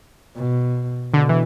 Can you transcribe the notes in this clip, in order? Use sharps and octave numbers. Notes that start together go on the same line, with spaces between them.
B2
B2 D3
E3